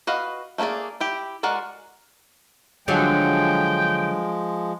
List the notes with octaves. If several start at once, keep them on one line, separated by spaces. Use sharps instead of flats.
F#4 B4 D#5 F5
A3 A#3 D#4 G#4 D5
E4 G4
G#3 F#4 A#4 D5 F#5
D3 F3 F#3 G#3 G5